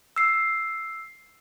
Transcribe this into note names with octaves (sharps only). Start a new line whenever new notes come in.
E6 C7